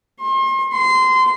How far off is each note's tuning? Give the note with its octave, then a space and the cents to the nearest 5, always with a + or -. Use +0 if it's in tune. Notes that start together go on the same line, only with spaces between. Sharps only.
C6 +40
C6 -20